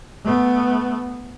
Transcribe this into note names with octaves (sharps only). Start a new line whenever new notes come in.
A3 B3